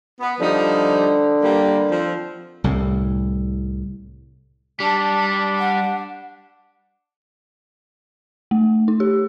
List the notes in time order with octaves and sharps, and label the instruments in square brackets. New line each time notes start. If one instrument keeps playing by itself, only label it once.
[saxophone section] B3
[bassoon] D3 [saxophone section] F3 G3 D#4
[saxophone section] G3 A#3
F3 C4
[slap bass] C2 A2
[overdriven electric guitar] G3 [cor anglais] D4 [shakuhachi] A5
[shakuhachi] F#5
[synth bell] A3
D#4
G4